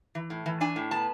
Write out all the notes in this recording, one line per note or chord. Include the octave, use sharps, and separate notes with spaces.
E3
A2
E3
D4 G#5
A2
B3 A5